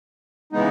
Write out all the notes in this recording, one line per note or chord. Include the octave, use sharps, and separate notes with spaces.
C#3 E3 G#3 B3 D#4